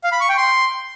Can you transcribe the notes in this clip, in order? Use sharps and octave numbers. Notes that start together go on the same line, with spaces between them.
F5
B5
C#6
G5
C6